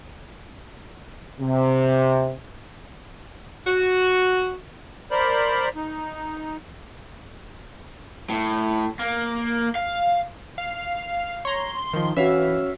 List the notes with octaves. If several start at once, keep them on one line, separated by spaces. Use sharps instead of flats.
C3
F#4
A#4 C5 D5 B5
D#4
A2
A#3
F5
F5
C#5 A#5 C6
D#3 F3
E3 C#4 F#4 E5 F5